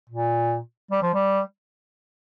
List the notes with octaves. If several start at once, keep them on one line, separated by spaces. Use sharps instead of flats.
A#2
G3
F3
G3